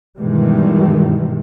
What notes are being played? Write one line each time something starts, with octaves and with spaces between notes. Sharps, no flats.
G2 B2 D#3 E3 G3 G#3